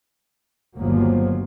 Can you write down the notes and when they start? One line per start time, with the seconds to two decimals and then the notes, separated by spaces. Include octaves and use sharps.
0.75 G1 D#2 F3 F#3 A#3